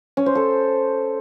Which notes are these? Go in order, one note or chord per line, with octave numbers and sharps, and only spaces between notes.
C#4
C5
A4